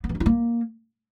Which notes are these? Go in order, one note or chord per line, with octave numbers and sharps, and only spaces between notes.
B3
E3
D#4
E4
A#3